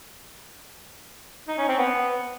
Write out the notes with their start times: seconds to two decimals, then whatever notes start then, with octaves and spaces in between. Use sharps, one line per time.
1.48 D#4
1.58 C#4
1.68 C4
1.79 B3